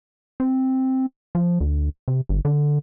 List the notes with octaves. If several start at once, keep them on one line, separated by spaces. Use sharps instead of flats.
C4
F3
D2
C3
G1
D3